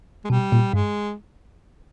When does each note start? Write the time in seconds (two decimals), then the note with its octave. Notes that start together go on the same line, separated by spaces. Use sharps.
0.24 G#3
0.30 B2 G3
0.52 A#2
0.73 G2 G#3